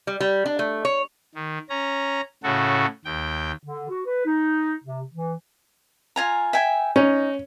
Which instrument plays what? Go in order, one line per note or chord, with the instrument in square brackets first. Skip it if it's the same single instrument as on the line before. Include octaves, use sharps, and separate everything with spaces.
[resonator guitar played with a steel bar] G3
G3
D4
A3
C#5
[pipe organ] D#3
C#4 A#5
A2 C#3 F#4 A4
D#2 G5
[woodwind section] D3
F#4
B4
D#4
C3
E3
[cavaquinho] F4 G#5 A#5
E5 G5 G#5
[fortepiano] C#4 [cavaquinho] D#4